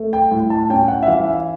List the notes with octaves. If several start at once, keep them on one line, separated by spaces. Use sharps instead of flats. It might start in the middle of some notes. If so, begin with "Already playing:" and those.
Already playing: A3
G5
A2
A5
C#4 G5
F#5
E5
E3 F5
E5